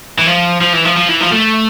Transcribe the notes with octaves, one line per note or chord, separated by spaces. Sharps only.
E3
F3
F3
E3
F3
F3
E3
F3
A3